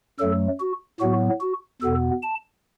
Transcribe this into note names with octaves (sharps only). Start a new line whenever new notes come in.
F#2 F#3 A3 A4
F#4
A2 F#3 B3 F#4
F#4
E2 B2 B3 A4
A5